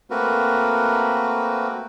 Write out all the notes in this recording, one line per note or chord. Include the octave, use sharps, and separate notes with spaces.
A3 A#3 C4 F#4 A#4 B4